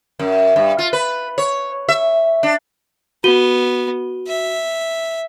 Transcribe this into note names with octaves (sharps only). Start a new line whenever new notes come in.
F#2
G2
F4
B4
C#5
E5
D4
B3 F#4 D#7 G7
E5